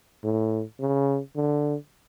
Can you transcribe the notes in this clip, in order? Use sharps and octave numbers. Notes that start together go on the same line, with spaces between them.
A2
C#3
D3